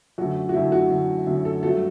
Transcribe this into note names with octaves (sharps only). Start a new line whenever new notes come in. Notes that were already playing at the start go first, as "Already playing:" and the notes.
F#2 D3 A3 F#4
F#4
F#2 D3 A3 E4
F#4
F#2 D3 A3
F#2 D3 A3
A4
G2 F#3 A3 A4